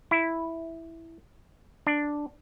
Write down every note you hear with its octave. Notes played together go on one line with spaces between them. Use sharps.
E4
D4